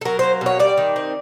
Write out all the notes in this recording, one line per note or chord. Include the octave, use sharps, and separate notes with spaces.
A4
F#3 A#4
A#3 C5
B2 C#5
G3 D5
D#3
C4